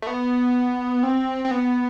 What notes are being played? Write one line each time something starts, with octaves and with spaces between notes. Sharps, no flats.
A3
B3
C4
C4
B3